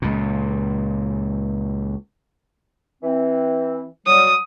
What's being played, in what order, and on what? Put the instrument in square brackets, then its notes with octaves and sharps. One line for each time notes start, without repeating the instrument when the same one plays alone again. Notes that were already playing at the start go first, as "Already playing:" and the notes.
[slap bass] C#2 A#2
[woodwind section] E3 C4
[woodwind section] F#3 G3 [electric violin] D#6